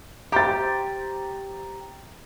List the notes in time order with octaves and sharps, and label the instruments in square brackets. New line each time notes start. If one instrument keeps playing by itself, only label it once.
[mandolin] G4 C5 [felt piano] A#5 A6